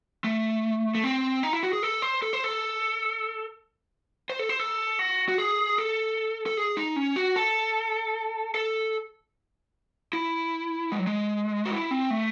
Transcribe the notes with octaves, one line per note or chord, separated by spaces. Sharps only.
A3
A3
C4
D#4
E4
F#4
G#4
A4
C5
A4
C5
A4
C5
A4
C5
A4
F#4
F#4
G#4
A4
A4
G#4
D#4
C#4
F#4
A4
A4
E4
G#3
F#3
G#3
F#4
E4
C4
A3